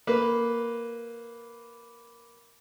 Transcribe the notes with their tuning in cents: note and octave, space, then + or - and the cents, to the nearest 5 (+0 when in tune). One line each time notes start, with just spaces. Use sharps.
A#3 +0 B4 +0